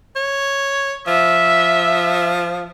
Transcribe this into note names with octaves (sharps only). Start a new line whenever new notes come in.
C#5
F3 E5